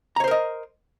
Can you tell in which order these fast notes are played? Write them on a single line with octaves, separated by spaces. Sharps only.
A#5 C#5 C5 A#4 D#5